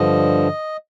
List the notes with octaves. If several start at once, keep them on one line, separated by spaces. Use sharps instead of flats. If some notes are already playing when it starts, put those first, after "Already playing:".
Already playing: G2 D3 F3 D#5